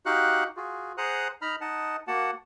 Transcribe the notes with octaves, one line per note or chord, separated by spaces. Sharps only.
D#4 F#4 G4 F5 F#5 F#6
F4 F#4 G#4
G#4 C5 F#5 A#5 D#6 F#6
D#4 A#5 B5 F6
D#4 D#5 F#5 A5
A#3 F#4 F#5 A5